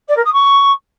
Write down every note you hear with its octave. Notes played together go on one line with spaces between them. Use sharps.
D5
A#4
D#6
C#6